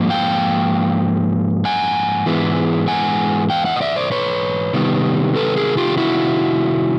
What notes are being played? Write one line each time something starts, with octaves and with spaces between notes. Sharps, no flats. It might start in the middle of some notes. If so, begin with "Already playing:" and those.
Already playing: G#2 F3 A#3
F5 G5
F#5 G#5
G#2 E3 G#3 B3
F#5 G#5
F5 G5
E5 F#5
D#5
D5 E5
C5 D5
B4 C#5
C3 D#3 G3 B3
A4 B4
G#4 A#4
F4 G4
E4 F#4